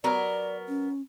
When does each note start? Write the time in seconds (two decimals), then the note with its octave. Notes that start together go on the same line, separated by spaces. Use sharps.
0.04 F#3 B3 A#4 D5
0.68 C#4